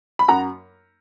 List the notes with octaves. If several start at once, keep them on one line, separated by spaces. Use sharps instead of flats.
B5
F#2 F#5 A#5